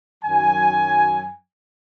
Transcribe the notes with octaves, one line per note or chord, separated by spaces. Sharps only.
F#2 D#3 F#3 G#5